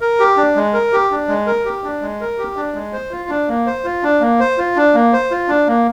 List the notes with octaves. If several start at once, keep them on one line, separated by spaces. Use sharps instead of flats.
A#4
G4
D4
G#3
A#4
G4
D4
G#3
A#4
G4
D4
G#3
A#4
G4
D4
G#3
C5
F4
D4
A#3
C5
F4
D4
A#3
C5
F4
D4
A#3
C5
F4
D4
A#3